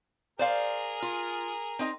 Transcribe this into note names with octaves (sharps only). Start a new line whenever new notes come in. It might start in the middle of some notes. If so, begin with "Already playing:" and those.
G#4 A#4 C5 D5 F5
F4
C4 D#4 D#5